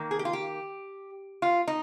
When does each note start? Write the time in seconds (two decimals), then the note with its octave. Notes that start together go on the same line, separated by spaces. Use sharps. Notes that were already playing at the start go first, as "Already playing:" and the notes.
Already playing: D#3 A#3
0.11 G#4
0.19 G4
0.25 F4
0.33 G4
1.42 F4
1.68 D#4